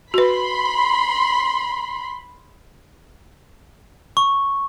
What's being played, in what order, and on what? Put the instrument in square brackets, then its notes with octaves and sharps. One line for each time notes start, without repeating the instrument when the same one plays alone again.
[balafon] F#4 B4 [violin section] B5 C6
[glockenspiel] C#6